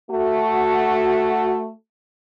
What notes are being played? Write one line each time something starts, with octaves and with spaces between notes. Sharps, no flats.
A3 F#4